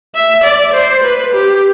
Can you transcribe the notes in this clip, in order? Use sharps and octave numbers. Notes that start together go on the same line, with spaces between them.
E5
D5
C5
B4
G4